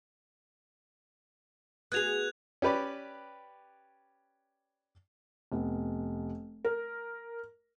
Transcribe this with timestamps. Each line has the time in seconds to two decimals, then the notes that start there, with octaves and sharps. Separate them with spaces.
1.92 B3 F#4 G#4 F#6 G#6 F7
2.62 C#4 G4 B4 D5
5.52 F1 B3
6.65 A#4